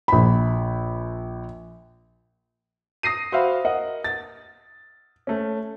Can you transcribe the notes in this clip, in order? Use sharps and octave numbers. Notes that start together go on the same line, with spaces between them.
A#1 B5
D#6 A#6 C7 D#7
F#4 C5 E5 F5 B5
A#4 D#5 F#5
A6
A3 C#4